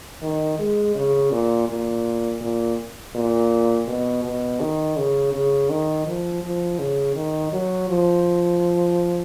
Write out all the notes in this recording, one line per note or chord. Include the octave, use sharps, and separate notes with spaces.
D#3
G#3
C#3
A#2
A#2
A#2
A#2
B2
B2
D#3
C#3
C#3
D#3
F3
F3
C#3
D#3
F#3
F3